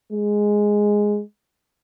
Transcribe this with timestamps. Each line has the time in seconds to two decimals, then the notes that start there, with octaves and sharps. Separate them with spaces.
0.13 G#3